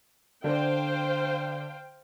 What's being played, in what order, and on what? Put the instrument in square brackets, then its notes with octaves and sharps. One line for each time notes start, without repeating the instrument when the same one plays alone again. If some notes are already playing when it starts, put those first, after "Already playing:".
[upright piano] D3 D4 [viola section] C5 F5 G5